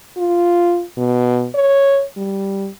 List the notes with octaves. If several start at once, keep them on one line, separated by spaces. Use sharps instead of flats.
F4
B2
C#5
G3